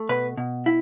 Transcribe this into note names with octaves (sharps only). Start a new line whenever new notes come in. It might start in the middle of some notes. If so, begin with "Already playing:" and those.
Already playing: A3
B2 B4
B2
E4